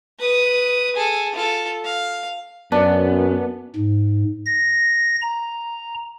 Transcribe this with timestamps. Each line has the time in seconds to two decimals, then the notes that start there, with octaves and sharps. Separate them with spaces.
0.19 B4 D#6
0.96 G#4 A4
1.35 F4 A4
1.84 F5
2.72 F#2 B3 D4
3.76 G#2
4.45 A#6
5.22 A#5